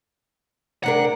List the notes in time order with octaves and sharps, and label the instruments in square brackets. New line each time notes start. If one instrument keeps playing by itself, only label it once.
[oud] C3 D4 A#4 [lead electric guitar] F#5